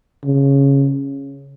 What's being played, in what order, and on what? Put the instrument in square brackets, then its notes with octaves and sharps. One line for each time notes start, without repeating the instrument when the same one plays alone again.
[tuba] C#3